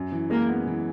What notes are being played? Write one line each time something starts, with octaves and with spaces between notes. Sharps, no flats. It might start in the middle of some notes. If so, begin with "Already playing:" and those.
Already playing: F#2
E3
G#3 A#3
B3
E3